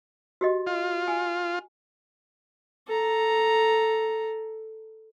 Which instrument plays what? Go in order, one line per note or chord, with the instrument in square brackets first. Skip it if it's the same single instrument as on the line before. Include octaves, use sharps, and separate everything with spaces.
[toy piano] F#4 G4 D#5
[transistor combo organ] F4
[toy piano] G#5
[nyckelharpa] A4 A#5